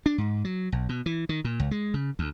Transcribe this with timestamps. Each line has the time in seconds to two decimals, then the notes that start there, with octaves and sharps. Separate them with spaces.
0.06 D4
0.18 G#2
0.45 F#3
0.72 B1
0.89 B2
1.06 E3
1.29 D#3
1.45 A#2
1.60 C#2
1.71 G#3
1.94 C#3
2.19 D2